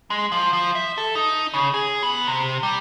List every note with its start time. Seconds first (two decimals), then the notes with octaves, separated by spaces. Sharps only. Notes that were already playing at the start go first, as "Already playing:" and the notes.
0.10 G#3
0.32 F3
0.53 F3
0.75 E5
0.98 A4
1.15 D#4
1.54 C#3
1.74 G#4
2.03 B3
2.27 C3
2.63 G3